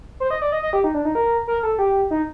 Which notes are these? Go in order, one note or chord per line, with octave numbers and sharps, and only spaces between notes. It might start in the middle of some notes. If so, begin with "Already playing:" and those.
C5
D#5
D5
D#5
D#5
G4
D#4
D4
D#4
A#4
A#4
A4
G4
D#4